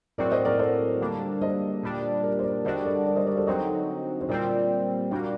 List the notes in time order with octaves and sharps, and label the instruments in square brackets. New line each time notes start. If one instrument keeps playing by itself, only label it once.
[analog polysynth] A2 F#3 C4 F#4 [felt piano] A#4 D5
[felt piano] C5 D#5
A#4 D5
A4 C5
[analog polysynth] D3 G3 A#3 D4
[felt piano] C5 D#5
[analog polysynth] A#2 G3 D4
[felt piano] A#4 D5
C5
A#4 D5
[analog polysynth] D3 G3 D4 F#4 [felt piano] C5 D#5
[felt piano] A#4 D5
A#4 D5
C5 D#5
A#4 D5
A4 C5
[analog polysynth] D3 F#3 C4 D#4 F#4 [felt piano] C5 D#5
[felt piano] C5
[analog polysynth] A#2 G3 C4 [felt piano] A#4 D5
[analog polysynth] A#2 G3 A#3 [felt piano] D4 F#4